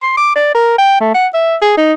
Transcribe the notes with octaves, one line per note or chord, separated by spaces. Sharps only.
C6
D6
D5
A#4
G5
A3
F#5
E5
G#4
D#4